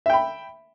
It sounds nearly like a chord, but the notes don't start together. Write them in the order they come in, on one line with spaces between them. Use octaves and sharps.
E5 G5 B5